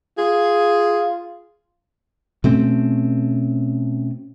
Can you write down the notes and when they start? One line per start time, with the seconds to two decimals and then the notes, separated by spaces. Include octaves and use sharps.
0.18 F4 G#4
2.44 B2 A3 C4 C#4